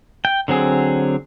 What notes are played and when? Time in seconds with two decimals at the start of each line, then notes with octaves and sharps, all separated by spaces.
0.25 G5
0.48 D3 F#3 C4 G#4